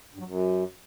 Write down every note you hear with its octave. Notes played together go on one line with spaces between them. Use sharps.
G2
F#3
F#2